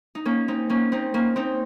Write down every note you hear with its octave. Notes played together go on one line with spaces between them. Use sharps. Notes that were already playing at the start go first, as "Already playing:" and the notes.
D#4
A#3 C#4
C4 D#4
A#3 C#4
C4 D#4
A#3 C#4
C4 D#4